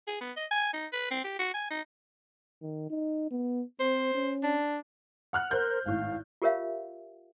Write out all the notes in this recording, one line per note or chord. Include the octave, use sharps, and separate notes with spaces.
G#4
B3
D#5
G#5
D#4
B4
C4
G4
F#4
G#5
D#4
D#3
D#4
B3
C4 C5
C#4
D4
F#5 F6 F#6
A#4 C5 G6
G#1 A2 F5
F4 G4 A#4 C#5 E5 F5